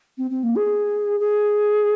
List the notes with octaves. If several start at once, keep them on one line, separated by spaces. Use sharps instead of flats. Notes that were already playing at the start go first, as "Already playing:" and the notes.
C4
C4
A#3
G#4
G#4